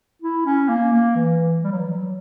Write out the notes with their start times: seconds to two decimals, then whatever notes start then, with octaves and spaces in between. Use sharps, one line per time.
0.22 E4
0.46 C#4
0.69 A#3
0.93 A#3
1.15 E3
1.64 G3
1.71 F#3
1.79 E3
1.87 F#3